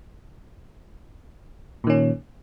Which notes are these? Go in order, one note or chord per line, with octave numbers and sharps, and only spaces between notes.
A#2 D#3 C#4